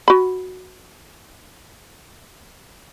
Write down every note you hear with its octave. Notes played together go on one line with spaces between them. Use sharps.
F#4 B5